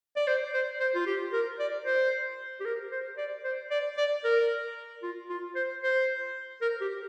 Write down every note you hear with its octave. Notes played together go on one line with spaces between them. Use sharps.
D5
C5
C5
C5
F4
G4
A#4
D5
C5
G4
A#4
C5
D5
C5
D5
D5
A#4
F4
F4
C5
C5
A#4
G4